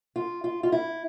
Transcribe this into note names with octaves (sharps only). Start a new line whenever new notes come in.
F4
F4
F4
E4